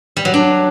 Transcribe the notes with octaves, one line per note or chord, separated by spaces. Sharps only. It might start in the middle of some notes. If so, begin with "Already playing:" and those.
G3
F#3
D4